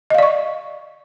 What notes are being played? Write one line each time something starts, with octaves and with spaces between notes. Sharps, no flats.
D5 D#5 F5 C#6